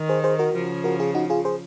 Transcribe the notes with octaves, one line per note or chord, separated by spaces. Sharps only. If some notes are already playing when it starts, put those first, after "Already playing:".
Already playing: D#3
G#4 C5
G#4 C5
F#4 A#4
C#3 F3
F#4 A#4
F4 G#4
D#4 F#4
F4 G#4
G#4 C5